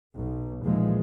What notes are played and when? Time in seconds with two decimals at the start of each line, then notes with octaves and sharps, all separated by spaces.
0.18 B1
0.65 D#2 A#2 E3 F3 G#3